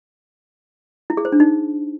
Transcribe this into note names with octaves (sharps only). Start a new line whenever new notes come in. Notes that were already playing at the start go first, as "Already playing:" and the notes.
E4
G#4
C5
D4
D#4